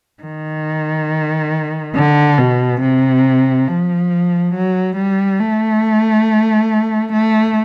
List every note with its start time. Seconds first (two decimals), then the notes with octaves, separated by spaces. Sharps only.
0.23 D#3
1.95 D3
2.39 B2
2.81 C3
3.68 F3
4.54 F#3
4.97 G3
5.40 A3
7.13 A3